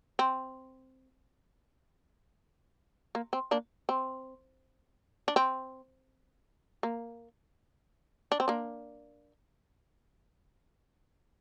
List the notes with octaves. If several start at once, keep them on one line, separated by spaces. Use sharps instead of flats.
C4
A#3
C4
A#3 D4
C4
D4
C4
A#3
D4
C4
A#3 D4